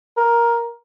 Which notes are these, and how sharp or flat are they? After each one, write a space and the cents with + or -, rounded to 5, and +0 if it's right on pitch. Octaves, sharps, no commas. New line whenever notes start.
A#4 +10